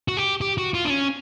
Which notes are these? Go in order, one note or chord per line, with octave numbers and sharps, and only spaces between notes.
F#4
G4
G4
F#4
F4
D4
C#4